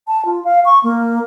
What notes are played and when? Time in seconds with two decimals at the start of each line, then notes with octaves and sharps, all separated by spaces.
0.08 A5
0.25 F4
0.45 F5
0.65 C#6
0.83 A#3